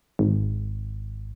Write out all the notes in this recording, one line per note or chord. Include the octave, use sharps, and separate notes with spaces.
G#1